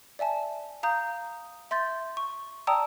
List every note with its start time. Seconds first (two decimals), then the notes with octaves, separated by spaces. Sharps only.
0.19 D5 E5 G#5 A5
0.83 F5 A#5 D#6 G6
1.71 E5 C6 G6 A6
2.17 C#6
2.67 D5 G5 A5 A#5 D#6 E6